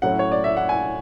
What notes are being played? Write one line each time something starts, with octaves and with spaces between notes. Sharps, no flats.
A2 F#3 A3 C#4 F#5
C#5
D5
E5
F#5
G#5